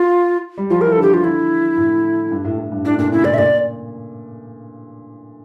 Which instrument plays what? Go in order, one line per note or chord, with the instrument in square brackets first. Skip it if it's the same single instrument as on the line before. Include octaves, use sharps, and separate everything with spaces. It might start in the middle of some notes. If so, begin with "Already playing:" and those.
Already playing: [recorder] F4
[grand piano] G3
[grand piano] F3 [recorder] F4
[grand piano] E3 [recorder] A#4
[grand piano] D3 [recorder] A4
[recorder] G4
F4
[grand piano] D3 [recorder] E4
[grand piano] A2
G2
A2
A2
G2
[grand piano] A2 [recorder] D4
[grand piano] A#2 [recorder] D4
[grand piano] C#3 [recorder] E4
[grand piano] A#2 [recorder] D5
[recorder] E5
[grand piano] A#2 [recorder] D5